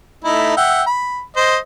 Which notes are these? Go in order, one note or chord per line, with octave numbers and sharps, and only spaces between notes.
A3 D#4 E4
E5 F#5 G5
B5
C5 D#5